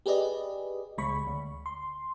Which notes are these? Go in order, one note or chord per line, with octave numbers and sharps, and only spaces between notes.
G4 G#4 B4 D5 D#5
C#2 G#3 B5 C#6
D2
C6